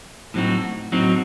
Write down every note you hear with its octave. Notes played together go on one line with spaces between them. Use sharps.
A2 F#3 C4 D#4 F#4
A2 F#3 C4 D#4 F#4